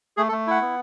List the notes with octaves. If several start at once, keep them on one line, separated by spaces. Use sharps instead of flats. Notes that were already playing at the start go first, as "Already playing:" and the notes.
A3 G#4
A4
A3
E4 F#5
B3